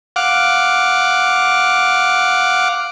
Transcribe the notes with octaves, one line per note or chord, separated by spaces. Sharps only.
F5 F#5 D6